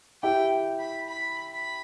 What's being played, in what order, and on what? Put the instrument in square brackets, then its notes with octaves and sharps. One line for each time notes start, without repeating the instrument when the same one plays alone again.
[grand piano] E4 G4 [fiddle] G5
[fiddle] B5
B5
B5